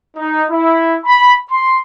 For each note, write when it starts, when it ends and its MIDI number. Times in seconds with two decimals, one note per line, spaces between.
0.16 0.42 63
0.50 0.96 64
1.04 1.34 83
1.50 1.75 84